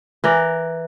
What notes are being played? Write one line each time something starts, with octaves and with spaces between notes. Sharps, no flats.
E3 A#4 D5